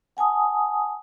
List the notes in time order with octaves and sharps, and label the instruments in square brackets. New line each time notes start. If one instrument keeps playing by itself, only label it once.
[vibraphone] F#5 G#5 A5 D#6